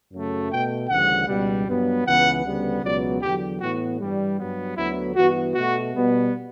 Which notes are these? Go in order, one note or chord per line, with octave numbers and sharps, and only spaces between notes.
F#2 C#3 F#3 A3
B2 A3 G5
D2 C#3 E3 G3 F#5
C#2 B2 G3
G2 F#3 B3
C#2 C#3 E3 B3 F#5
D2 C#3 G3 B3
C#2 B2 F#3 B3 D5
E2 D3 F#3 G4
A2 E3 B3 F#4
G2 E3 G3
G2 F#3 B3
D2 D3 F#3 B3 E4
G2 E3 B3 F#4
B2 A3 F#4
B2 G3 B3